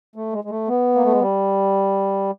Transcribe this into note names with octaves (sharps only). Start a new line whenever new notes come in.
A3
G#3
G#3
A3
B3
A#3
A3
G#3
G3